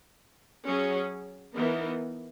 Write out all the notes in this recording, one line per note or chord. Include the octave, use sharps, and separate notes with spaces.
F#3 C#4 G#4
E3 B3 D#4 A#4